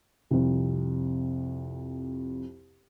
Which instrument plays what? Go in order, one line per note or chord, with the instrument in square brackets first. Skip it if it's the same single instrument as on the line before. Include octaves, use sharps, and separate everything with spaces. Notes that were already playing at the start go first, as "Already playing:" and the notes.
[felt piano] C2 F2